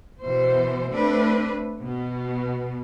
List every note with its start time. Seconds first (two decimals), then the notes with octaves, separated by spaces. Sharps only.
0.22 B2 E3 C5
0.92 A3 C4 D4 B4
1.79 B2